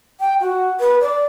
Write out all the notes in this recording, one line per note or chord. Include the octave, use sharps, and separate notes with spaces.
G5
F#4
B4
D5